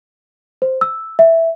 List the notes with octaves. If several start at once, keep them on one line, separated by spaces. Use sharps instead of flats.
C5
E6
E5